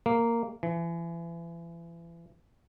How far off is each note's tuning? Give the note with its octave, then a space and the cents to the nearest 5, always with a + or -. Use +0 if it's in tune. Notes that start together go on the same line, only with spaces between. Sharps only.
A#3 -10
E3 +35